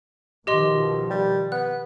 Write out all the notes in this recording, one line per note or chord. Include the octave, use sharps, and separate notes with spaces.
B2 D#3 F3 G4 D#5 C6
G3
B3 F#6